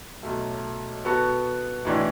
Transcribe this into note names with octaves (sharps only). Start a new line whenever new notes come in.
B1 B2 F#3 A3
B2 B3 F#4 A4
B1 A2 E3 D4